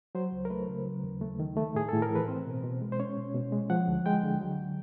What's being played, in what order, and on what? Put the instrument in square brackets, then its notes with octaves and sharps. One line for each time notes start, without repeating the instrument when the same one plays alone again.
[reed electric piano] F#3 C5
C#2
A#4
A3 B4
C#3
F#3
D#2
A3
D#3
A3
A2 G#4
A2 A4
A#4
E3
B4
C4 C5
B2
B2
G#3
C5
C#4 C#5
B2
B2
G#3
F3 F#5
D2
G#3 G5
D3
F#3